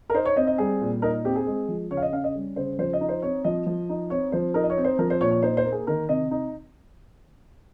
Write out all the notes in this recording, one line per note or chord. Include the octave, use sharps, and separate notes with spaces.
A#4
D#4 C5
C#5
C4 D#5
D#5
G3 G#4
A#2
D#4 A#4
C4 G4
G#4
G#3
F3
C#3 C#5
F5
D#5
C#4 F5
D#5
G3
C#3 C5
F3 C5
D#5
D#4
C5
C4 C#5
F3 D#5
F3
D#4
C4 C#5
F3 C5
D#4 A#4
D#5
C#5
C4
C5
F3 A#4
C5
A#2 C#5
C#5
D#4 C5
C5
A#3
G#4
D#3 A#4
C3 D#5
D#4